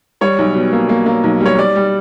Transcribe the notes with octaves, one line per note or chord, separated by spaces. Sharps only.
G3 C#5
B1
B2
A#3
A#3
A#3
B1
G3
C#5
G3 D5
G3